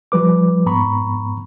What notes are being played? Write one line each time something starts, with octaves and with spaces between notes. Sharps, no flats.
F3 G3 B4 D6
F2 G#2 B3 A#5 B5 C#6